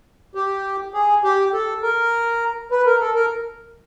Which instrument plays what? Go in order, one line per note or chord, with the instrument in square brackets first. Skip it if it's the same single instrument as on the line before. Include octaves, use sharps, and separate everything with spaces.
[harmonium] G4
G#4
G4
A4
A#4
B4
A#4
A4
A#4